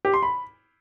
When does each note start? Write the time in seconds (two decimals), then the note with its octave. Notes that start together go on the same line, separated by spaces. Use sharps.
0.05 G4
0.14 C6
0.23 B5